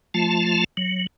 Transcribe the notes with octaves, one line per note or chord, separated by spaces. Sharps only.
F3 A3 F4 A5
F#3